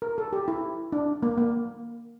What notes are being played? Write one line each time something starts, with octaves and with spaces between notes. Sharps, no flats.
A#4
A4
G4
E4
D4
A#3
A#3